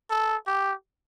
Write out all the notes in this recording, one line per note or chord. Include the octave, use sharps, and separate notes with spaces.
A4
G4